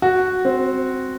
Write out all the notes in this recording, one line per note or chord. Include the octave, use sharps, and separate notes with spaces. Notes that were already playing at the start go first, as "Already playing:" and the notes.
F#4
C4